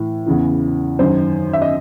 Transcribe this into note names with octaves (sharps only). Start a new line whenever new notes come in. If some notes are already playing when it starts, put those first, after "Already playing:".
Already playing: A2 E3
E2 C#3 E3
F#2 D#3 C5
E5
D#5